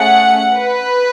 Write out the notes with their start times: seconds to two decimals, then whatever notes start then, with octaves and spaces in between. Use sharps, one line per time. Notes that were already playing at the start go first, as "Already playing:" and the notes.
Already playing: A3 C#4 G#4 F#5
0.57 B4